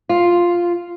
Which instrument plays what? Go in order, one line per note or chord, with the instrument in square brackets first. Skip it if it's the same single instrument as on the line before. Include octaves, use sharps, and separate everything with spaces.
[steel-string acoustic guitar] F4